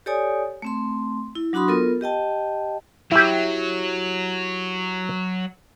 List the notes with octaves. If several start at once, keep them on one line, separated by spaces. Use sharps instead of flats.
G4 A4 C#5 D5 G#5 D#6
A3 C4 C6
E4
F#3 D4 F#4 B5 C6 D#6
B3 F4 A4 A#4
G4 D#5 G5 A5
F#3 E4 G4